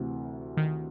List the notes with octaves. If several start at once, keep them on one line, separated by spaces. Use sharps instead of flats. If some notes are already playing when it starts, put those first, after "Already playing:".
Already playing: D2 C3 E3
D#3